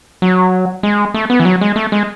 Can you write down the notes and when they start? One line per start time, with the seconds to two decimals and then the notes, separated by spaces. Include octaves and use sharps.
0.22 F#3
0.83 G#3
1.14 A3
1.30 B3
1.40 E3
1.45 F#3
1.61 G#3
1.76 A3
1.92 G#3